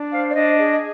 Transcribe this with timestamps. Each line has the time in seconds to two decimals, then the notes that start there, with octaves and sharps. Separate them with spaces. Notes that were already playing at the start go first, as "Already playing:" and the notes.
Already playing: D4
0.12 C5 F5
0.29 D5
0.35 D4 D#5
0.58 G#4